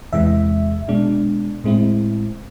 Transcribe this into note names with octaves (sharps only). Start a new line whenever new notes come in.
E2 C3 E3 G#3 E5
B2 G#3 D4
A2 G#3 C4 E4